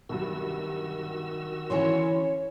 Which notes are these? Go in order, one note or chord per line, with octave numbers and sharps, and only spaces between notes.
C2 G2 D#3 F#3 F#4 E6
D3 E3 C#4 E4 C#5 C6